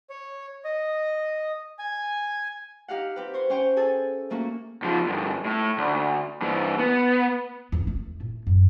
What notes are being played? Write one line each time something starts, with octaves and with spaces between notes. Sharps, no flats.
C#5
D#5
G#5
D#4 G4 F5 F#5
C4 G4 B4
C5 C#5
C#4 C5 C#5 G5 G#5
G#4 A4 G#5
A3 A#3 C#4 F#4
C#2 F3
D2 G2
A2
D2
G2 E3
B3
E2 C#4
E2 A3
A2
F#2